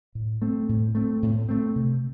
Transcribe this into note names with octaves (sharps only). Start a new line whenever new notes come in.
A2
A3 C4
A2
A3 C4
A2
A3 C4
C3